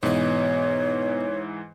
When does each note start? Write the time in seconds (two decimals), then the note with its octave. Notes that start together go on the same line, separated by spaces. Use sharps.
0.03 G#2 B2 E3 C#5 G#5